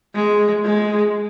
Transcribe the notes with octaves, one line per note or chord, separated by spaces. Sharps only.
G#3
G#3